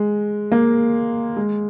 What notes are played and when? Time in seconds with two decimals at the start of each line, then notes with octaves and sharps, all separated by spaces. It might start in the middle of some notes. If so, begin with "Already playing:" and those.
Already playing: G#3
0.52 A#3
1.37 G#3